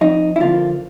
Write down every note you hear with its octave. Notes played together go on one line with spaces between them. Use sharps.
F2 D#4
E4
D3 F3 A#3 F4